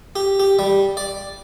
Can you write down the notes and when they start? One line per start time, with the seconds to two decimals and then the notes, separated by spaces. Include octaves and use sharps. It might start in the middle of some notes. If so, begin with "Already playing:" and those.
0.16 G4
0.40 G4
0.59 G3
0.97 D5